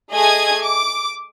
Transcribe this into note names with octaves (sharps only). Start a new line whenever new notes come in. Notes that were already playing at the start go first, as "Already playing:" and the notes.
A3 G#4 D#5 G#5 D#6 G#6
D6